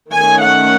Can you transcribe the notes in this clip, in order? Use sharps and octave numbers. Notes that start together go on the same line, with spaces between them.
D#3 A3 C#4 G#5
F#5